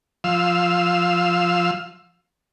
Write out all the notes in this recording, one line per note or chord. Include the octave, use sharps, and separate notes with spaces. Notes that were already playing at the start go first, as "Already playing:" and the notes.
F3 F5 E6